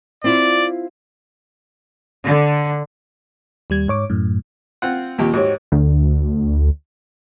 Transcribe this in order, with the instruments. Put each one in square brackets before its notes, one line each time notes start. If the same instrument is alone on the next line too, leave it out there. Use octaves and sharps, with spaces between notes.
[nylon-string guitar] C4 E4 F4 [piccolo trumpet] D5
[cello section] D3
[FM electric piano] D#2 G3 G#6
G#2 C#5 D6
F#2 A2
[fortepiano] C4 F4 F#5
[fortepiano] D#2 A#2 [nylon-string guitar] C4 G4 G5
[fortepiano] G#2 [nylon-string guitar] F#4 G4 C#5
[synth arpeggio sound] D2